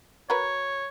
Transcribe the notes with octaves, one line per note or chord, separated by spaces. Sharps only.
F#4 A#4 B4 C#5